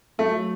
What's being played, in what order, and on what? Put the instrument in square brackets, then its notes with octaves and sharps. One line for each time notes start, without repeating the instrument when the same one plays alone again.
[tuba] F#3 [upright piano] A3